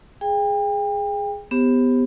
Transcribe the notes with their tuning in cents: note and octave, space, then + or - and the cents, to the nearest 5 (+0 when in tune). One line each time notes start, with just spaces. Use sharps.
G#4 +0 G5 +35
B3 +15 G4 +15 C5 +30